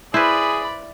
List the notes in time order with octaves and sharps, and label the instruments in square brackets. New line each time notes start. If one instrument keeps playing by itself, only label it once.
[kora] E4 [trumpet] G#4 [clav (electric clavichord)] B4 C5 [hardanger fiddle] D5 B5